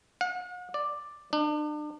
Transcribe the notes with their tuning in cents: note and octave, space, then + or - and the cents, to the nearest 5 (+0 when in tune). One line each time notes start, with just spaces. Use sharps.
F#5 -45
D5 +5
D4 +40